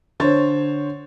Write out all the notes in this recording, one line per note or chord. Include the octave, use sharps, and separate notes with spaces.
D3 C5 C#5 A6